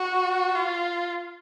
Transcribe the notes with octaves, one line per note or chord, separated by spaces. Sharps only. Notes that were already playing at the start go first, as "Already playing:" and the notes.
Already playing: F#4
F4